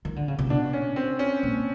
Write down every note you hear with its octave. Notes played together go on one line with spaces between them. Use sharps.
D#3
D3
C#3
C3
B2 D4
C#4
C4
C#4
A#2